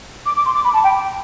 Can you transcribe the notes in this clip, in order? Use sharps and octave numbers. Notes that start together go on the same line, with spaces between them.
D6
D6
C6
D6
B5
A5
G5